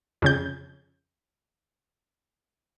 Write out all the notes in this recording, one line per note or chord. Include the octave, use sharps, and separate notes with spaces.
F2 C#3 G6